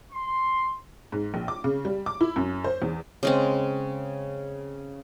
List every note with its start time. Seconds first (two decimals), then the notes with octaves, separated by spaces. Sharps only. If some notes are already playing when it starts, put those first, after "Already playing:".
0.12 C6
1.12 G#2
1.34 A#1
1.48 D6
1.64 C#3
1.85 G3
2.06 D6
2.21 E4
2.36 F#2
2.64 C5
2.82 E2
3.23 C#3 G#3 C4